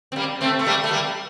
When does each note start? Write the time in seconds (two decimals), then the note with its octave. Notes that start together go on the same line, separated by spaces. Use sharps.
0.12 C4
0.16 G3 A#3
0.41 A3 C4
0.59 A3
0.66 G3 A#3
0.84 A3
0.91 G3 A#3